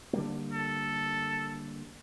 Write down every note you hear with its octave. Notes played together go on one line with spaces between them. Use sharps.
D3 G3 A#3
A4